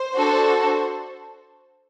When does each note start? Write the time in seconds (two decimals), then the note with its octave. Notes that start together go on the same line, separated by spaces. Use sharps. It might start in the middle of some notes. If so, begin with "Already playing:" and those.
Already playing: C5
0.16 D4 F#4 A4